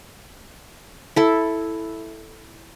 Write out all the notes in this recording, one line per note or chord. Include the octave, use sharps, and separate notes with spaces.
E4 A4